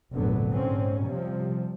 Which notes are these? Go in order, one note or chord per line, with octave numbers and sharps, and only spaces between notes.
F1 A#1 G#2 D3 F#3 B3
G#2 D3 C4 C#4
C3 F3 G3